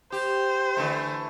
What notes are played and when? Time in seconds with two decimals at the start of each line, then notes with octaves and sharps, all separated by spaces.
0.12 G4 C5
0.77 D3 E3 A3